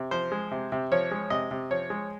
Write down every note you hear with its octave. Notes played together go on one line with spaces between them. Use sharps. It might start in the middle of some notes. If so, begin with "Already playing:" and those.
Already playing: C3
F3 C5
G#3
C3
C3
F3 C#5
G#3
C3 D#5
C3
F3 C#5
G#3